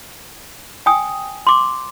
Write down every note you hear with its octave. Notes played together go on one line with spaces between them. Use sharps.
G5 G#5 D#6
C6 D6